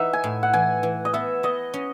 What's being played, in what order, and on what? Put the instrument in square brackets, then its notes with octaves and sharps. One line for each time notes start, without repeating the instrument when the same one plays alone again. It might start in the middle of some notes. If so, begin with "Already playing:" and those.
Already playing: [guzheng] E3 D#4 [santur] E5 F#5
[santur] G#5
[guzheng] A2
[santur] F#5
[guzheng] E3 [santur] G#5
[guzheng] E3
[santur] D#5
[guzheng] B3 [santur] E5
[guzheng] B3 [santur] D#5
[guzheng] C#4